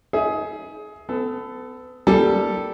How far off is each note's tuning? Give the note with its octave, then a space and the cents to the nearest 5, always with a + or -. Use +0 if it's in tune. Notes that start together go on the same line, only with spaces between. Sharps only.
D#4 +35 G#4 +20 E5 +0
B3 +35 A4 +0
G3 +0 A#3 +10 A4 +0